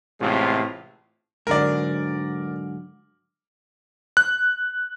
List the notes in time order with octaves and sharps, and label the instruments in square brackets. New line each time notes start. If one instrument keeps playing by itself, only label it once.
[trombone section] A1 A2 C3 G#3 F4
[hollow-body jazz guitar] G#2 D3 F#3 [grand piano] A#4 D5
[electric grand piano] F#6